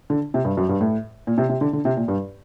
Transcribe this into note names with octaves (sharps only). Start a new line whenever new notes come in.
D3
C3
G2
F#2
G2
A2
A#2
C3
C3
D3
D3
C3
A#2
G2